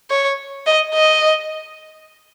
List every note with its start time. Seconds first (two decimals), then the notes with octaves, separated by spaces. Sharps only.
0.10 C#5
0.67 D#5
0.95 D#5